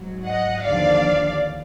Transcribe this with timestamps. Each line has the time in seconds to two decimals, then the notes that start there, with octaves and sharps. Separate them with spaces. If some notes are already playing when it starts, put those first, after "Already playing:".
Already playing: G#2 F#3
0.26 D#5 F#5
0.63 D#2 D3 F3 D5 F5